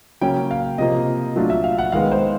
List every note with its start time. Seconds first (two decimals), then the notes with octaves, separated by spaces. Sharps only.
0.21 C#3 F#3 A#3 C#4 G5
0.51 F5
0.78 C3 F3 A#3 D#5
1.36 F#3 A3 D4 F4
1.50 E5
1.64 F5
1.78 F#5
1.92 D#3 G#3 B3 F5
2.12 C5